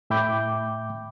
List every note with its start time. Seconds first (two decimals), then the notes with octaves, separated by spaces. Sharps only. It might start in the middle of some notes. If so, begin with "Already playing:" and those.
0.10 A2 E5 G5 B5 D6 G6